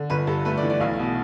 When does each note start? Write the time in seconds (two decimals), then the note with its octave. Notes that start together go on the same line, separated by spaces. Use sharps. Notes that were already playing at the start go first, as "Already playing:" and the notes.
Already playing: D3
0.10 G1 B4
0.27 G2 A4
0.45 A3 B4
0.58 D5
0.63 E3
0.70 D5
0.80 B1 F5
0.99 B2